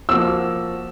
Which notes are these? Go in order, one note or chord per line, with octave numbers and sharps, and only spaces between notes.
F3 A#3 F#4 E6